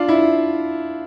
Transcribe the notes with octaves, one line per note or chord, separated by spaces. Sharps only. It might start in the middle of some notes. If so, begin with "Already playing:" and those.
Already playing: D4 F4
E4